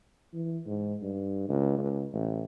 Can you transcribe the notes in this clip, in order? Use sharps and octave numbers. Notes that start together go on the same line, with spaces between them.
E3
G#2
G2
C#2
C#2
A1